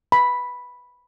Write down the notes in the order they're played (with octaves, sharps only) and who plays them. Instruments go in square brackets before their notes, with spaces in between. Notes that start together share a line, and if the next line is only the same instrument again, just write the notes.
[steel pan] B5